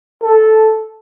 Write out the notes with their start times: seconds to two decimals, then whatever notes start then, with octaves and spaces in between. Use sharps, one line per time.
0.22 A4